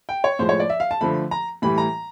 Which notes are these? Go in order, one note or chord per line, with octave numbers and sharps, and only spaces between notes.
G5
C#5
A2 F3 G#3 C5
C#5
D5
E5
F5
A5
D3 F3 A3 B5
A#5
A2 E3 G3 B5
A#5